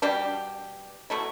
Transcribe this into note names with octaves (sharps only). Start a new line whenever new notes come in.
B2 G3 D4 G4
B2 F#3 A3 E4